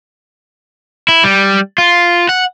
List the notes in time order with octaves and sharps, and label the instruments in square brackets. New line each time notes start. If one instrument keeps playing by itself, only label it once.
[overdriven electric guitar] E4
G3
F4
F#5